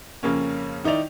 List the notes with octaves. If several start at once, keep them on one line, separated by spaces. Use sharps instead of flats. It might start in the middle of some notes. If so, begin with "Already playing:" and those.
F2 C#3 A#3 C#4
D#3 D#4 E4 D5 F7